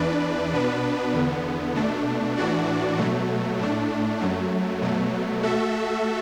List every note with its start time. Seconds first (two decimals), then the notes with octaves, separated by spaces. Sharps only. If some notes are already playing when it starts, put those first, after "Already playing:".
Already playing: E2 E3 D4 B4 D5
0.52 B2 B3 D4 B4
1.14 E2 D3 B3
1.75 B2 A3 D4
2.37 A2 E3 D4 F#4 D5
2.98 B2 F#3 A3
3.59 A2 A3 D4
4.20 F#2 F#3 A3
4.82 B2 F#3 A3
5.43 A3 F#4 A4 E5